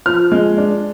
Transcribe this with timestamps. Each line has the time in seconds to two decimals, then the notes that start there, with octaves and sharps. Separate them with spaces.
0.06 F3 F6
0.32 G#3
0.58 D4